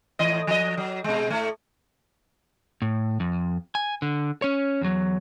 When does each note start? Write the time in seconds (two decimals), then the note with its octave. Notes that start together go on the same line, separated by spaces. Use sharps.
0.19 A2 E3 D#5
0.47 F3 D#5
0.77 F#3
1.04 B2 G#3
1.30 A2 A3
2.82 A2
3.20 F2
3.75 G#5
4.02 D3
4.42 C#4 C#5
4.81 E2 F#3